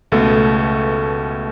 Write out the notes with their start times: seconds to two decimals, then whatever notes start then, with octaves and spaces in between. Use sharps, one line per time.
0.12 C#2 B2 A3 A4